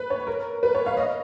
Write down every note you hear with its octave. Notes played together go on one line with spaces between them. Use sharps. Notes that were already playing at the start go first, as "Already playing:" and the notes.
Already playing: B4
C#5
A#4
B4
C#5
F5
D#5